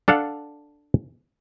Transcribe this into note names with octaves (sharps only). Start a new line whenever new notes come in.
D4 A4 F5 F#5